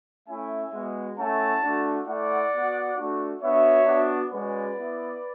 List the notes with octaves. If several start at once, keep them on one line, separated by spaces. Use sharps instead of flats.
A3 C#4 E4 E5 G#5
G#3 B3 F#4
A3 C#4 E4 F#5 A5
A3 D4 F#4
A3 E4 D5 F#5
B3 F#4
A3 D4 F#4
B3 D4 F#4 C#5 E5
B3 D4 F#4
G#3 C#4 F#4 B4 D5
B3 E4